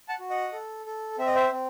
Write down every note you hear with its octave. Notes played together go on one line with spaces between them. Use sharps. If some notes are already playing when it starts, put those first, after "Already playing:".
F#5 A5
F#4
D#5 F#5
A4
A4
C4 E5
D#5
C5 E5
C4